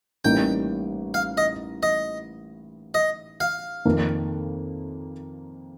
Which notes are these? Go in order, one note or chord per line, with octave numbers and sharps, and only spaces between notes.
A1 A2 G3 A#3 D#4 G5
F5
D#5
D#5
D#5
F5
F2 D#3 A#3